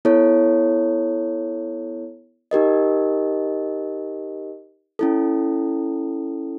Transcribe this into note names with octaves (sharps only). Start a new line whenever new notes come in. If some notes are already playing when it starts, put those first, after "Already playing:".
B3 E4 A4 C#5
D#4 G4 A#4 D#5
C#4 E4 A4